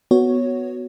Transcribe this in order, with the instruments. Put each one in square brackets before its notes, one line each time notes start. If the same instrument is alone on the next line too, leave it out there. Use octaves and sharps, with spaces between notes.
[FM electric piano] B3 F#4 C#5